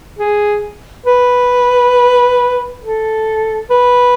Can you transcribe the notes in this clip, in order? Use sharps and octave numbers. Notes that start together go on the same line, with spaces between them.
G#4
B4
A4
B4